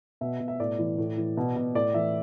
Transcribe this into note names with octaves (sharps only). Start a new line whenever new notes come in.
B2 E5
B2
E5
A2 D5
E3
A2
E3
B2
B2
A2 D5
E3 E5